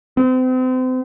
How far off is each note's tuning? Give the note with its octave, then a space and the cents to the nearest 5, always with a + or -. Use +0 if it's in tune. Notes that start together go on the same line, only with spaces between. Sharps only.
C4 -35